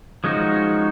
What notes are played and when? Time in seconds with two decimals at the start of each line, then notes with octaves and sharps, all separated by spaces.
0.24 F3 G#3 C#4 D#4 F#4